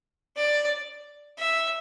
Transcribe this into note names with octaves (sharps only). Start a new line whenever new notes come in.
D5
E5